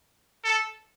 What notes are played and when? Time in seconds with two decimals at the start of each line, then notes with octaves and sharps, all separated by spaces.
0.45 A4